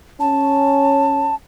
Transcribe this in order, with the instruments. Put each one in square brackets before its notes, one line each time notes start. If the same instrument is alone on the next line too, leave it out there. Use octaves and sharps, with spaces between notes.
[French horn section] C#4 [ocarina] A5